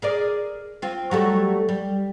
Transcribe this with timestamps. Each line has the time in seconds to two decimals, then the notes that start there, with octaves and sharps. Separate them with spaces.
0.02 G#4 A#4 D5
0.82 C4 F4
1.11 F#3 G3 A3
1.69 G3